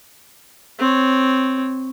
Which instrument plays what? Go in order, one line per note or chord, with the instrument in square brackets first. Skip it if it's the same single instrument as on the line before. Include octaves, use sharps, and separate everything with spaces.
[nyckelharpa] C4 C#5